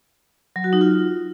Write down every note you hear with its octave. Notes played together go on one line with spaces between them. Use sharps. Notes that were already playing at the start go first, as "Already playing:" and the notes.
F#3
F#4
D#4
F4